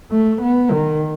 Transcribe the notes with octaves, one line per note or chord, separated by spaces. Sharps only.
A3
B3
D#3